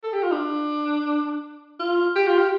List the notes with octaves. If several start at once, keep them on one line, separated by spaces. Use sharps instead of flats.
A4
G4
F4
D4
F4
G4
F4
G4